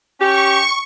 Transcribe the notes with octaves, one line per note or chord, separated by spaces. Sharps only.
C#4 G4 C#6